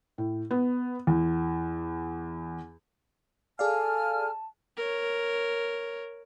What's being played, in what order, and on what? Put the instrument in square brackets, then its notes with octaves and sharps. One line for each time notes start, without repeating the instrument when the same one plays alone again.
[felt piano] A2
B3
E2
[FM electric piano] G#4 D5 F5 [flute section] A4 G#5 F6 [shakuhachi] A5
[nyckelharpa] A#4 C#5